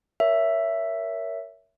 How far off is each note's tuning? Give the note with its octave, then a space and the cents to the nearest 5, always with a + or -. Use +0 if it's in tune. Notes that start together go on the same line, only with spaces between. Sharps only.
A#4 +0 C#5 +20 E5 +10